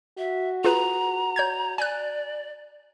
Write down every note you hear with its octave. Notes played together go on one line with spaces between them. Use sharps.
F#4 E5
F4 G#4 B4 A#5
C#5 G6 G#6
D5 G#5 F#6